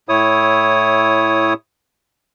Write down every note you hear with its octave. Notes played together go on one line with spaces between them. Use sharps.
A2 E4 C#5 D#6